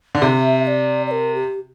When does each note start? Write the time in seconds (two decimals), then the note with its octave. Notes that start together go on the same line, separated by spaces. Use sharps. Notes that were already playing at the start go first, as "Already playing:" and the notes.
0.15 D3
0.22 C3 E5
0.64 E5
0.67 D5
1.07 D5
1.11 A#4
1.35 G4